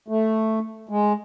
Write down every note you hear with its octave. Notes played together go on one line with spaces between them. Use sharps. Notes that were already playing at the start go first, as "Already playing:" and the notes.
A3
G#3